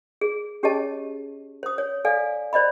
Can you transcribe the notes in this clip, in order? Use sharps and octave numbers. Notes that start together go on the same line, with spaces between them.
G#4
C#4 G4 G#4 C#5 D#5 A5
C5 D#6
C#5
A4 D5 F5 G#5
C5 D5 D#5 B5